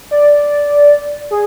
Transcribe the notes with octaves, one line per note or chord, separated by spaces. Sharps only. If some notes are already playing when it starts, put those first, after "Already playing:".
D5
G#4